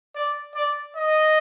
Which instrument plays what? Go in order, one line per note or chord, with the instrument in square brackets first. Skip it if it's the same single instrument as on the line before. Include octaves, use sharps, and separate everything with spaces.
[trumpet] D5
D5
D#5